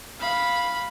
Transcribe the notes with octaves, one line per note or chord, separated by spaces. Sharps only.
F5 B5